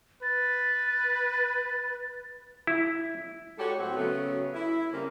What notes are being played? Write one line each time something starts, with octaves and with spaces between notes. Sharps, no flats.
B4 A6
E4
G#3 F#4 G4 A4 C#5
A2 F#3 C4 F#4
C#3 F#3 A3 B3 C#4
E4
C#3 G3 A#3 C4